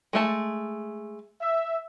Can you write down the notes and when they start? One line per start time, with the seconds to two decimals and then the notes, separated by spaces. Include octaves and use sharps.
0.13 G#3 A3 A5
1.41 E5